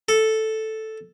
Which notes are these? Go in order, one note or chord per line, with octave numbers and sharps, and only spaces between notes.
A4